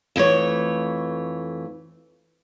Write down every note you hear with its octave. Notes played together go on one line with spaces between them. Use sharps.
F2 E3 A3 C#5